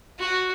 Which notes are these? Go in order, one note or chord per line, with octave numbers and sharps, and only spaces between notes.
F#4